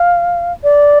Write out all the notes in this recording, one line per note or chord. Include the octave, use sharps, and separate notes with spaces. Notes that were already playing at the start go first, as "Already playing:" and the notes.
Already playing: F5
D5